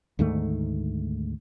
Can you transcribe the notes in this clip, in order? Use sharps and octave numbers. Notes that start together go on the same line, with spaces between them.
D2 G#2 D#3 A3